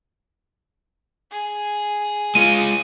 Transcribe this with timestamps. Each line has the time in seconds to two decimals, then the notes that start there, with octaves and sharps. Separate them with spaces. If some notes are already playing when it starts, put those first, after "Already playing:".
1.31 G#4
2.35 G#3 F4 D#7